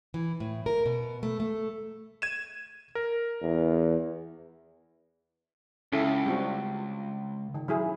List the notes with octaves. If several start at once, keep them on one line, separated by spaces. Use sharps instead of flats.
E3
A2
A#4
B2
A3
A3
G#6 D#7 E7
A#4
E2
C#2 C#4 E4 A4
G3 C4 F#4
D#3
F#3 E4 G#4